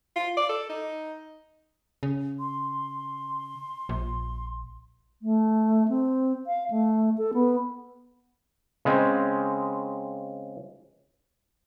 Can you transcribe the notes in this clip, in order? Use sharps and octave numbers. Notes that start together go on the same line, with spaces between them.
F4
D5
A4
D#4
C#3
C6
A#1
A3
C4
F5
A3
A4
B3
C#3 G#3 C4 C#4